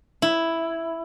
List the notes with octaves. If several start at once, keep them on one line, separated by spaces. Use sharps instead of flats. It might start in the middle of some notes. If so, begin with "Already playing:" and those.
E4